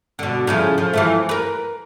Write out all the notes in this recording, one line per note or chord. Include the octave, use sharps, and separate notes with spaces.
B2 D3
A2 C#3 F3
F3
E3 F3 A3
A#4 B4